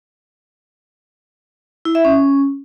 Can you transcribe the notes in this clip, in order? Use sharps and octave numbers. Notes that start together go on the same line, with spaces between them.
E4
E5
C#4